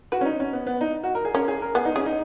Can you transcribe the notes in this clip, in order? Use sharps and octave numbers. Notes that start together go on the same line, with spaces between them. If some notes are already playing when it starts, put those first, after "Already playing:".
F#4 B4
C#4
D#4
C#4
B3
B3
D#4
F#4
A#4
G#4
C#4 A#4
G#4
A#4
B3 G#4
D#4
C#4 G#4
D#4